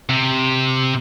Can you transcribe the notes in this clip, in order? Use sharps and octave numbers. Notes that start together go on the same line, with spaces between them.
C3